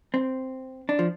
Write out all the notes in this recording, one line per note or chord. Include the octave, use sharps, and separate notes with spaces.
C4
D4
F3